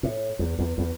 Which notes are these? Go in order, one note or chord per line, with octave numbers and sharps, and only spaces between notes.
A2
E2
E2
E2